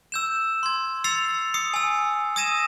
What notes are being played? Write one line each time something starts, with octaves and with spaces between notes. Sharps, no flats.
E6 G6 E7
C6 G#6
E6 A6 C7 C#7 F7
D#6 C7 C#7
G#5 E6
D#6 E6 G#6 A#6 D#7 E7